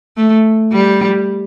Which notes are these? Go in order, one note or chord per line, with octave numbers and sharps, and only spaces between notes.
A3
G3